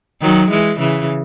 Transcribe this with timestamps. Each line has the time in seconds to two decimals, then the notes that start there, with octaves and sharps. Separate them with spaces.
0.21 D#3 F#3
0.50 E3 G#3
0.79 C#3 E3